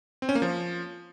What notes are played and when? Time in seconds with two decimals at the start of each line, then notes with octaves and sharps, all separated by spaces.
0.22 C4
0.29 C#4
0.35 A#3
0.42 F3